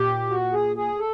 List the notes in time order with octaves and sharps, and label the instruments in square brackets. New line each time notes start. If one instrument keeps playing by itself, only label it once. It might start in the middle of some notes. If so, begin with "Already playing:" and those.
Already playing: [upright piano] A#2 [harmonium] G4
[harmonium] F#4
G#4
G#4
A4